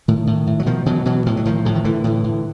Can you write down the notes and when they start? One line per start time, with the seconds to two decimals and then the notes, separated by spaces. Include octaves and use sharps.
0.08 A2 D#3
0.27 A2
0.47 A2
0.60 F#3
0.66 B2 D#3 F3
0.86 B2 E3 F#3
1.05 B2 E3 F#3
1.26 A2 F3
1.37 F#3
1.45 A2 D#3 F3
1.65 A2 D3
1.75 D#3
1.84 A2 D3 E3
2.04 A2
2.24 A2